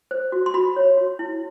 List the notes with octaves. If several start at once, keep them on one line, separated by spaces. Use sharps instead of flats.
C5
F#4
C6
F#4 B5
C#5
F#4
E4